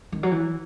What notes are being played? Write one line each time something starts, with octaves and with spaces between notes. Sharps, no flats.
D#3
F#3
E3